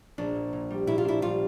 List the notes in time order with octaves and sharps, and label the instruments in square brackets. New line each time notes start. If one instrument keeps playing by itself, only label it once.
[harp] A#1 [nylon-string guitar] D4
[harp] A#2
A#2
G3
[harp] A#1 [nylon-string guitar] E4
[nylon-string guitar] F4
[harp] D4 [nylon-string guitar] E4
[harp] G3 [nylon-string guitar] F4